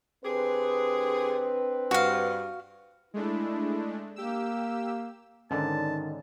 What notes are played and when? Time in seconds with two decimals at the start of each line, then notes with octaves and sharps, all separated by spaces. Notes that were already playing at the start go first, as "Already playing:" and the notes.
0.25 D3 C4 D4 G4 G#4 B4
1.91 G2 F#4 F5
3.14 G#3 A3 D4 E4
4.16 A#3 G4 E6
5.51 G#2 D3 D#3 C#4 D4 A5